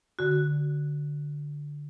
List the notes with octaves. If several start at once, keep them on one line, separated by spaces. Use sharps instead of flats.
D3 F#4